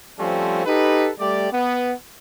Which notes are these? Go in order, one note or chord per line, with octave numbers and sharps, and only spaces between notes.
F3 G3 A3 C4 C#4
D#4 G4 A4 B4
G3 A3 G4 D5
B3